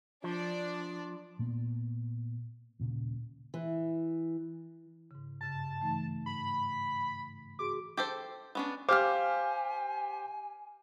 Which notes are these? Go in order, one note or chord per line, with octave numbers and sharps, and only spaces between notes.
F3 D4 D5
A#2 A#3 B3
D#1 A#2 C#3
E3
G#2 C#3
G2 C#3 A5
E3 A3 D#4
G#2 B5
F#4 G#4 C6 D6
G4 A4 C5
B3 C#4 D4
G4 C5 F5 G#5 D6 F6